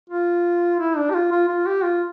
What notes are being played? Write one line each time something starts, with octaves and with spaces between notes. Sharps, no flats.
F4
E4
D4
G4
F4
F4
F4
G4
F4